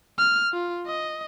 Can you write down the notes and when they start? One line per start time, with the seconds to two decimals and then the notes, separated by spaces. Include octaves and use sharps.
0.18 F6
0.53 F4
0.87 D#5